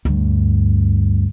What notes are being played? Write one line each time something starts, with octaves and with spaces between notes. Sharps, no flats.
D2 G2